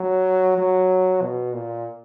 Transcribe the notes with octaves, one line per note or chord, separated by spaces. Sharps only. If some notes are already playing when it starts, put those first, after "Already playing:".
Already playing: F#3
F#3
B2
A#2